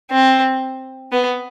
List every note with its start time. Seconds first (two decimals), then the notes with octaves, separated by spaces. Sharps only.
0.11 C4
1.12 B3